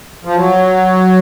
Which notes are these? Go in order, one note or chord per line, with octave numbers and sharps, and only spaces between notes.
F3
F#3